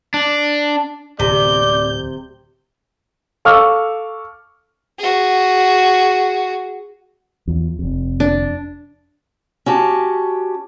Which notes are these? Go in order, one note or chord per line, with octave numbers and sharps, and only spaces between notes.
D4
D1 C3 D5 G6
A4 F5 C#6 D6 E6 F6
F#4 G#4
E2 F3
F1 F2
D4
C#4 F#4 G4 A5